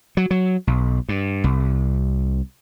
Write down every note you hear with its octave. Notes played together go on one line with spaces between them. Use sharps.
F#3
F#3
B1
G2
C2